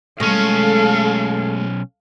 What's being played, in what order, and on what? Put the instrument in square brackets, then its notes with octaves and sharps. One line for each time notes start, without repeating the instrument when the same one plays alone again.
[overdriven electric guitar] B1 C#4 [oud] G#3 A3 D#5 [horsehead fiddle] A4 F5